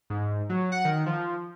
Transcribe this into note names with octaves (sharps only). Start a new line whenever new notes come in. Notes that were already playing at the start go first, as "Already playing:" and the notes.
G#2
F#3
F#5
D#3
F3